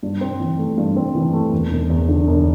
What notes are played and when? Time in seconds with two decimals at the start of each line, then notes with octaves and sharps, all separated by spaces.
0.03 G2
0.21 C4
0.40 E3
0.59 A3
0.77 G2
0.96 C4
1.15 E3
1.34 A3
1.52 E1
1.70 E1
1.90 E2
2.09 D3
2.27 E1